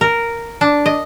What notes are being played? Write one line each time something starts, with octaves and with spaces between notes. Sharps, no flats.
A#4
D4
D#5